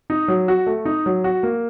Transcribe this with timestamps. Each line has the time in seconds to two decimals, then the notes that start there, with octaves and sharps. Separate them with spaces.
0.10 D#4
0.28 F#3
0.48 F#4
0.66 A3
0.85 D#4
1.06 F#3
1.24 F#4
1.43 A#3